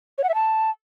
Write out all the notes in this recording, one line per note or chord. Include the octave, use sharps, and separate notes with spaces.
C#5
F#5
E5
A5